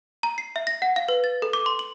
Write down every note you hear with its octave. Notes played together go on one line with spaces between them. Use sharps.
A#5
C7
E5
A#6
F#5
F5
B4
A6
A4
D6
C6
F#7